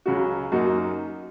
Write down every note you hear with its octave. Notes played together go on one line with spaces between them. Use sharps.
C#2 C#3 F#3 C#4 F#4
F#2 F#3 A#3 D#4 F#4